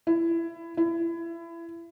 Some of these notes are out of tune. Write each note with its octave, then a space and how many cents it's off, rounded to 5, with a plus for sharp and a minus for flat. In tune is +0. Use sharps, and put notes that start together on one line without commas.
E4 +20
E4 +25